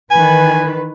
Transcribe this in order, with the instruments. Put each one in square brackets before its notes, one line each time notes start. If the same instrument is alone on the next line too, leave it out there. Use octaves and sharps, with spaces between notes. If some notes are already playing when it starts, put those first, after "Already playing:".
[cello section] D#3 E3 B4 [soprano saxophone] G#5